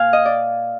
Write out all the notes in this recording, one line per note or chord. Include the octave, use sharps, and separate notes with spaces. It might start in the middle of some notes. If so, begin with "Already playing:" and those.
Already playing: A#2 F5 G#5
D#5
D5